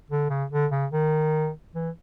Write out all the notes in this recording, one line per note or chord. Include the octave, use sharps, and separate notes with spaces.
D3
C#3
D3
C#3
D#3
E3